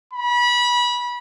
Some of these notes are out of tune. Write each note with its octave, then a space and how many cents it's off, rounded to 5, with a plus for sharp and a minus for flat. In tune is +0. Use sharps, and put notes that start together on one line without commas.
B5 -25